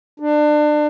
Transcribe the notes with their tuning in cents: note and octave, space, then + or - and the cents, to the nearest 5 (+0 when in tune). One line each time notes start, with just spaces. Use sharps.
D4 +30